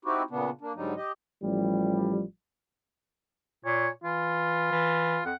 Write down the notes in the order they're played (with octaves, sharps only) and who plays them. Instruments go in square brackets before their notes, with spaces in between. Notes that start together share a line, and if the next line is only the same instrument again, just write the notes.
[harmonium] C4 D#4 E4 F#4 G4
A#2 C#3 B3 D4
A#3 D4
G#2 D3 F#3 G3 D#4
G4 D#5
[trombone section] A1 F3 G3
[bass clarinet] A#2 [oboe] C#5
[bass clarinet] E3 [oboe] F4
[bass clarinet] E3
[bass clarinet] F2 [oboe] F#5